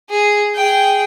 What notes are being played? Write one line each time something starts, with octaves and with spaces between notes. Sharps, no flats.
G#4
G#4 G5